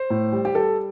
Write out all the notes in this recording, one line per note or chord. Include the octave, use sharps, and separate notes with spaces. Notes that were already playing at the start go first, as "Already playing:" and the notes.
Already playing: C5
A2
G3
G4
G3 A4